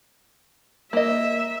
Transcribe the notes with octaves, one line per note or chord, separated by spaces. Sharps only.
A#3 D#5 E5